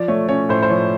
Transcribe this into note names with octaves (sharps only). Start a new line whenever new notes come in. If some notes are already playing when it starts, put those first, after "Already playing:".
Already playing: F3 D5
A3 C#5
C#4 C#5
A2 C5
C5
F3 C#5